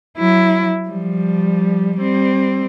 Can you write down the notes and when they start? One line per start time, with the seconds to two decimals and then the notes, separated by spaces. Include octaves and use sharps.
0.18 F#3 E4
0.89 F3 G3
1.97 G3 C4